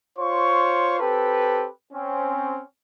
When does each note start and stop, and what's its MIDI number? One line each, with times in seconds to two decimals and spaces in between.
0.17 0.99 65
0.17 0.99 72
0.17 0.99 73
0.17 0.99 84
0.17 0.99 85
0.99 1.66 60
0.99 1.66 67
0.99 1.66 69
0.99 1.66 71
1.93 2.61 60
1.93 2.61 61